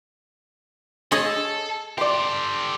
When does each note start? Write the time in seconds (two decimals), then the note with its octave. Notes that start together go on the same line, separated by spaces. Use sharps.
1.12 G#4 A4 C#5 D#5
1.98 G4 A4 D5 C6